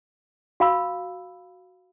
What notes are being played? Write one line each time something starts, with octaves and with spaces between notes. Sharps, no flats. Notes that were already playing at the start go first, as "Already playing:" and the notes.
F#4 F5 B5 E6